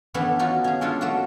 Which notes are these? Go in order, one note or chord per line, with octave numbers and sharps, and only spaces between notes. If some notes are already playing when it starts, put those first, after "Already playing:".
E3 A3 B3 C#4 D4
C#4 D#4 F4 F#4
C#4 G#4
G#3 C#4 D4 F4 A4
A3 A#3 F4 F#4